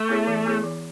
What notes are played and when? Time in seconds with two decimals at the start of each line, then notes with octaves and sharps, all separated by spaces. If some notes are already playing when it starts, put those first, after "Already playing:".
Already playing: A3
0.09 B3 E4 G#4 C#5
0.27 E3
0.46 B3 E4 G#4 C#5
0.64 E3